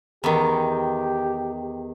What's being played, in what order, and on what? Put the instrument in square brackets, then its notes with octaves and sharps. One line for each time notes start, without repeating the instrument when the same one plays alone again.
[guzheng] E2 D#3 [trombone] G4